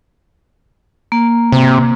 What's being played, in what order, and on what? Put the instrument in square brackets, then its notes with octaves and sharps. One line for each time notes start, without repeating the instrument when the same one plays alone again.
[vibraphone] A#3
[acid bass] C3